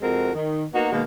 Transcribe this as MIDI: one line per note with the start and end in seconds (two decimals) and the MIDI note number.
0.01 0.32 41
0.01 0.32 56
0.01 0.32 60
0.01 0.32 66
0.01 0.32 70
0.34 0.64 51
0.73 0.91 58
0.73 0.91 59
0.73 0.91 63
0.73 0.91 66
0.92 1.03 47
0.92 1.03 51
0.92 1.03 56
0.92 1.03 58